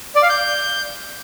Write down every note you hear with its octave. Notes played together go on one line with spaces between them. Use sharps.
D5
F5
G6